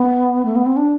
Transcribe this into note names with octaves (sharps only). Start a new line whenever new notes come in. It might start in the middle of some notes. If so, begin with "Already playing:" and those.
Already playing: B3
A3
B3
C4
D4